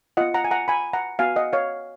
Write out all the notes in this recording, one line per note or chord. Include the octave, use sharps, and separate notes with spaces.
B3 F4 D#5 F#5
F#5 A#5
G#5
F#5 A#5
G#5 B5
F#5 A#5
B3 F#4 F5 G#5
D#5 F#5
C#5 F5